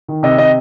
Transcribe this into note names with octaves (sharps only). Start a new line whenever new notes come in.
D#3
C3 D#5
C3 D#5